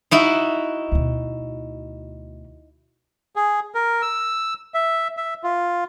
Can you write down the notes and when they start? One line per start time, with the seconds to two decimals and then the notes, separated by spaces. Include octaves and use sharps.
0.11 D#4 E4 F#4
0.92 D2 B2
3.36 G#4
3.75 A#4
4.02 E6
4.74 E5
5.17 E5
5.43 F4